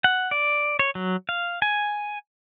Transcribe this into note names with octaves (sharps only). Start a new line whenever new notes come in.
F#5
D5
C#5
F#3
F5
G#5